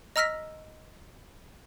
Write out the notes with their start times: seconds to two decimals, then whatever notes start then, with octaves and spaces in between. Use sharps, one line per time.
0.16 D#5 A#5 E6 F6 A#6 B6